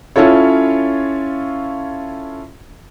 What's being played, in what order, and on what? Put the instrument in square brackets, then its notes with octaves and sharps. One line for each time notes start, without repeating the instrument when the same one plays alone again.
[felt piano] C#4 E4 F4 A4 C#5